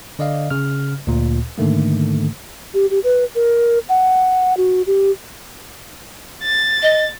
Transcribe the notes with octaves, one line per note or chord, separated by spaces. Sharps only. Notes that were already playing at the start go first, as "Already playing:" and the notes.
D3 D5 D#5 F5
C#3 F6
D2 A#2
G#2 D3 D#3 A3 A#3
G4
G4
B4
A#4
F#5
F#4
G4
A6
D#5